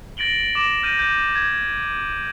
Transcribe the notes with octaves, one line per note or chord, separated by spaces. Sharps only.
A6 A#6 D7 F#7 G7
D6 A#6 E7
F6 G6 A#6 D#7
G6
G#6